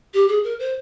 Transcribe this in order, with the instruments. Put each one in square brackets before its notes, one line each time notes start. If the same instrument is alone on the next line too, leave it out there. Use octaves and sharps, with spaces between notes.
[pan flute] G4
G#4
A#4
C5